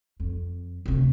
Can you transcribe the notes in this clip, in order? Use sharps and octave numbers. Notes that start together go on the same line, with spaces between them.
F2
D2 C3